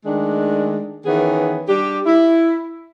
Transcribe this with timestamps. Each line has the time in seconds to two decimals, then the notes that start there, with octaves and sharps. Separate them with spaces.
0.04 D#3 G#3 A3 D4
1.05 D#3 E3 B3 C#4 G#4
1.67 G3 D4 G4
2.06 E4